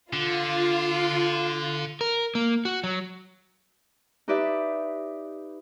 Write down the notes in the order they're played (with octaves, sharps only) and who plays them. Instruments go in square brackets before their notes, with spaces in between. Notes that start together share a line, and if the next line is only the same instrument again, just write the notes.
[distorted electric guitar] D3 [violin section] F4
[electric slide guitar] A#4
A#3
F#4
F#3
[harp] D#4 G4 B4 D5 E5